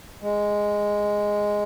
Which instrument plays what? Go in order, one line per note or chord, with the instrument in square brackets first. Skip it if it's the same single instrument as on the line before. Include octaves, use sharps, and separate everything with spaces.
[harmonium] G#3